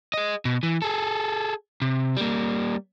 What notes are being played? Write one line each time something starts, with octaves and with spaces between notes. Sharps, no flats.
G#4 D#5
B2
E3
G#4 A4
C3
G3 A#3